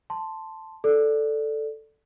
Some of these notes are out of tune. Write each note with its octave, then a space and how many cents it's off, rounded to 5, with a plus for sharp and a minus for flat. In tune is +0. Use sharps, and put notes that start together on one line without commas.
A5 +0 C6 +0
A4 +0 D5 +0